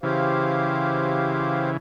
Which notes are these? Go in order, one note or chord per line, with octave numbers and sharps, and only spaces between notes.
C#3 E3 G4 C5 F5